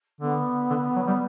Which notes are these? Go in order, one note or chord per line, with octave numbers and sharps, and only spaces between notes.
D3 B3
D3
F#3
G3